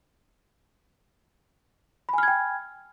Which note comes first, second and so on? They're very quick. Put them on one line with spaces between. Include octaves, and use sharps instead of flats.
B5 G#5 F6 G#6 G5